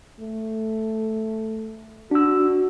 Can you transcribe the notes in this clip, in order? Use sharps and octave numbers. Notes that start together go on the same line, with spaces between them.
A3
D4 F#4 E6